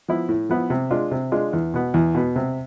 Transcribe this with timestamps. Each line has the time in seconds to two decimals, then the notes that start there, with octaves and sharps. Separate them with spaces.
0.08 F3 B3 E4
0.29 A2
0.49 F3 B3 E4
0.70 C3
0.91 G#3 D4 F4
1.11 C3
1.32 G#3 D4 F4
1.53 E2
1.74 B2 B3
1.94 E2
2.15 B2 B3
2.36 C3